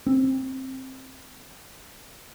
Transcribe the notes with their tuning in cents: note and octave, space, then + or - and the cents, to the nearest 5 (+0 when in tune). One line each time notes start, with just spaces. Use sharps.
C4 +15